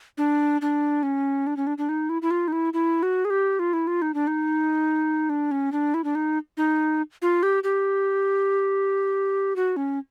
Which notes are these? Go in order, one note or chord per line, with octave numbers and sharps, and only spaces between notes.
D4
D4
C#4
D4
C#4
D4
D4
D#4
E4
E4
F4
D#4
E4
E4
F#4
G#4
G4
F4
E4
F4
D#4
D4
D#4
D4
C#4
D4
E4
D4
D#4
D#4
F4
G4
G4
F#4
C#4